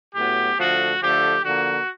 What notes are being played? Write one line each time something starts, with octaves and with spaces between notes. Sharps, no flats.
A2 F#3 B3 G4
D3 F3 A3 F#4
D3 F3 A3 G4
D3 F3 A#3 F#4